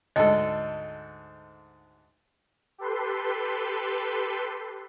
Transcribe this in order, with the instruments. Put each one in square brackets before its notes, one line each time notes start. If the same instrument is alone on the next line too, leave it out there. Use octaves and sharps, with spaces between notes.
[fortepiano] D2 G#2 A4 [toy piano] D#5
[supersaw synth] G4 A4 B4 C6